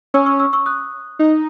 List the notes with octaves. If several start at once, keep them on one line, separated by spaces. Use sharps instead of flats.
C#4 C#6 E6
C#6 E6
C#6 E6
C#6 E6
D#6 F#6
D#4